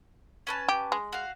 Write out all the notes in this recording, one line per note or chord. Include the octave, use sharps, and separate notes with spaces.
C#4 B4 A5
G4
G#3
F#4 F5